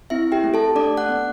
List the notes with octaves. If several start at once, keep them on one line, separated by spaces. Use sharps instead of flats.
C4 E4 E5
G4 G5
A3
A4 A5
D4 D5 D6
F#5 F#6
B3